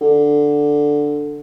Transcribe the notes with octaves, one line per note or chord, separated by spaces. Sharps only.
D3